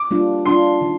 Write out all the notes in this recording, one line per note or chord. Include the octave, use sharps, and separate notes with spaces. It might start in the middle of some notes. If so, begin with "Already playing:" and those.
Already playing: D6
G3 A#3 D4 F4
G3 D4 F4 C6
D#3